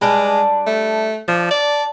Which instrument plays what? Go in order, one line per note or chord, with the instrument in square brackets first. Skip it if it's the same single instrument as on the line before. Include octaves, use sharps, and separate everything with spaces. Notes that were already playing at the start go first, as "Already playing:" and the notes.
[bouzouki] G3 D4 B4 [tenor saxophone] G#3
[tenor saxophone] A3
[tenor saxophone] F3 [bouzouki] D4
[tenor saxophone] D5